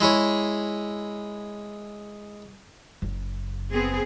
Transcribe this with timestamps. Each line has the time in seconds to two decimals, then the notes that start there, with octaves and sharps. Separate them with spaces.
0.01 G#3 E4 G#4 C#5
3.02 F#1
3.72 B3 C4 G#4